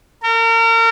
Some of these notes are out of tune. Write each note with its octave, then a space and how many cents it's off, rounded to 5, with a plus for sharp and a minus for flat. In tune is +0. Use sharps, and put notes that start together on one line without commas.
A#4 -35